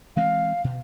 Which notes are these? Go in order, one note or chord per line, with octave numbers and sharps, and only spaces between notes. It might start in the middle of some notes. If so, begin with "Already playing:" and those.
E3 G#3 C4 F5
B2